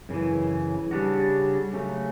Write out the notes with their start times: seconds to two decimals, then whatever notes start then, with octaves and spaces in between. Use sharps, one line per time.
0.09 F#2 C#3 E3
0.91 C#3 G3 D4 F#4
1.73 C#3 F#3 A3